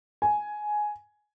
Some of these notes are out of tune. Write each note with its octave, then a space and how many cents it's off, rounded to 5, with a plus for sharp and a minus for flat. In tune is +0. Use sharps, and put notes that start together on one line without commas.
G#5 +10